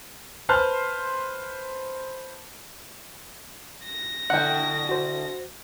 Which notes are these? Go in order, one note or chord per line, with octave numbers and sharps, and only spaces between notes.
B4 C5 A5 C6 F6
A#6
B2 D3 E4 F#5 G5
F#4 C5